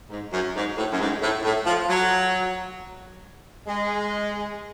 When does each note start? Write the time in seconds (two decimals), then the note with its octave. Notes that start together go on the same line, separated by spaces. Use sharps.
0.10 G#2
0.33 F#2
0.56 G#2
0.78 A2
0.91 F#2
1.00 G#2
1.22 A2
1.44 A2
1.66 F3
1.89 F#3
3.67 G#3